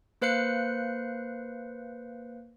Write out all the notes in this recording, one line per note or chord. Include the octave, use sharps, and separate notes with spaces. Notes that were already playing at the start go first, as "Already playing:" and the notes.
A#3 B4 C5 F5 F#6 C#7